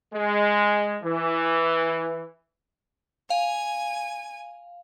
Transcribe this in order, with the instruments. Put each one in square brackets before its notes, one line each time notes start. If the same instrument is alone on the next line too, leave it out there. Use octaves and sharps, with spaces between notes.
[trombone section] G#3
E3
[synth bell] F5 [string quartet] G#5